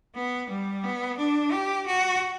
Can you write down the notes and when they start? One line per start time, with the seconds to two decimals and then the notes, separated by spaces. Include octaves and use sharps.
0.15 B3
0.50 G3
0.84 B3
1.18 D4
1.52 G4
1.87 F#4